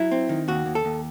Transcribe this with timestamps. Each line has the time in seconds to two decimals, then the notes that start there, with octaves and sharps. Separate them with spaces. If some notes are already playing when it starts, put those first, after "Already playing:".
Already playing: F#3 E4
0.11 C4
0.29 D#3
0.48 D#2 F#4
0.66 D#2
0.75 A4
0.85 D#2